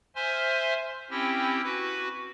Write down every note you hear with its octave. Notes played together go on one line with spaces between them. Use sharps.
C5 E5 G#5 C6 F6
C4 C#4 E4 G4 G5
F#4 B4